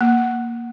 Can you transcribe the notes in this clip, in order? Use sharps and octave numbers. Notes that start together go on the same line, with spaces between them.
A#3